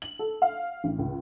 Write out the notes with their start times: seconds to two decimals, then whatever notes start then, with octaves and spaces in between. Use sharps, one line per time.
0.02 F#7
0.19 A4
0.42 F5
0.84 A1
0.99 C#2